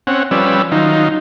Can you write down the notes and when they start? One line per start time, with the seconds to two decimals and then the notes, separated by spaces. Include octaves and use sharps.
0.07 C4 C#4 F#5
0.31 F3 G3 C#4 B4 D5 E6
0.72 D#3 F#3 D#4 F4